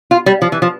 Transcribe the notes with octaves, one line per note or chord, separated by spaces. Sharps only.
F4
G3
F3
E3
F3